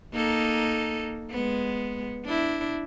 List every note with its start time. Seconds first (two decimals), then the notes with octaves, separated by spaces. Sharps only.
0.13 A#3 D#4 A4
1.31 G#3 B3
2.24 D4 E4